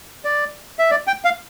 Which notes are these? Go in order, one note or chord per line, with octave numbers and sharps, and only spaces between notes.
D5
E5
D5
G5
F5